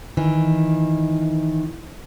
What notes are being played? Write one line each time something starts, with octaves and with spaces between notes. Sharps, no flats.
D#3 E3